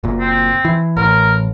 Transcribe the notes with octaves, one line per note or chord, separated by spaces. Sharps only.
F#1 A#2
C4
E3
A1 A#4